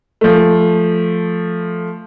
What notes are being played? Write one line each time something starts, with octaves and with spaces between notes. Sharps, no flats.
F3 A3